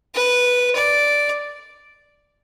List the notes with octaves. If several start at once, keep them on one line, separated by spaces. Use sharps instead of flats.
B4
D5